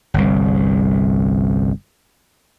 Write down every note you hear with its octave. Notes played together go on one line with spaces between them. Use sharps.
G1 C2